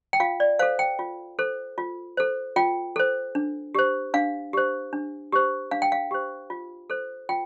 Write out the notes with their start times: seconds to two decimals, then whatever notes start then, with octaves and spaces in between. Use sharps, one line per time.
0.13 G5
0.20 F4 F5
0.40 D5
0.59 A4 C5 F5
0.79 G5
0.99 F4
1.39 A4 C5
1.78 F4
2.17 A4 C5
2.56 F4 G5
2.96 A4 C5
3.35 D4
3.75 G4 C5
4.14 D4 F5
4.53 G4 C5
4.93 D4
5.32 G4 C5
5.71 D4 F5
5.82 G5
5.92 F5
6.11 G4 C5
6.50 F4
6.90 A4 C5
7.29 F4 G5